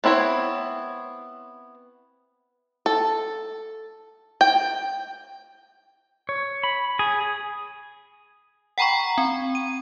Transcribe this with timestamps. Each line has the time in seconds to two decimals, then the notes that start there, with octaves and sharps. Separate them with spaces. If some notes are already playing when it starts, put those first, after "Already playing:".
0.04 B3 C4 E4 A#4 C#5
2.86 A4
4.41 G5
6.29 C#5
6.63 B5
6.99 G#4
8.78 F#5 G5 A#5 B5 C#6
9.18 C4
9.55 D#7